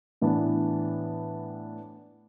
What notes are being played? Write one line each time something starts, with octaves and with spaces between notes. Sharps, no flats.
A2 E3 B3 D4